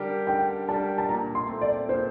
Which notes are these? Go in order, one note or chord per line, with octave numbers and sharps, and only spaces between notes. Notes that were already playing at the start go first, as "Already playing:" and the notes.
Already playing: D3 G3 D4 G4 A#4
D3 G5
G3 D4 G4 A#4 A5
A5
A#2 A#5
C6
A3 C4
D5
A#2 C5